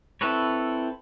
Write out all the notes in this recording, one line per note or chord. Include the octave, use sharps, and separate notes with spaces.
C4 E4 A4 B4 C#5